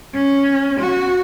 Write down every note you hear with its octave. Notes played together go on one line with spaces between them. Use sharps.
C#4
F#4